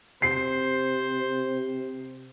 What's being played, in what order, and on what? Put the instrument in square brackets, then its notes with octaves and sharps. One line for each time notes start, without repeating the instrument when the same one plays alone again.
[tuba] C3 [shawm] C5 [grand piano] C7